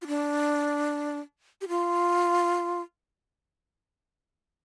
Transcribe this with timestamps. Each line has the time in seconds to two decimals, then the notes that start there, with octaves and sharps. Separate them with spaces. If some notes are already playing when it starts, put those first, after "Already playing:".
0.02 F4
0.07 D4
1.61 G4
1.68 F4